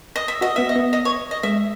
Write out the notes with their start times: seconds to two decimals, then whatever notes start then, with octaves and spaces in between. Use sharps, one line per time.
0.16 D#5
0.28 E5
0.41 F#4 D#5
0.56 B3 E5
0.69 D#5
0.75 B3
0.93 D#5
1.05 C#5
1.31 D#5
1.43 G#3 E5